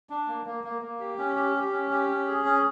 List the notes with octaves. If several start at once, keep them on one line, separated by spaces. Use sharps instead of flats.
D4
A#3
A#3
A#3
A#3
G4
C#4
G4
G4
C#4
G4
C#4
G#4
C#4